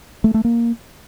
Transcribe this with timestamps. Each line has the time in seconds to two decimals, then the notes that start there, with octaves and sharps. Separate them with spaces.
0.24 A3
0.34 A3
0.45 A#3